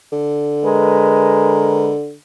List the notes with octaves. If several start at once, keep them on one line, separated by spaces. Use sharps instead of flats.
D3
G#3 A#4 B4